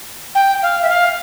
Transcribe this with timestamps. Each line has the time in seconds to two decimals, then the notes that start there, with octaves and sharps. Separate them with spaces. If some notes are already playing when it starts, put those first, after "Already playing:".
0.35 G5
0.62 F5
0.82 E5
0.89 F5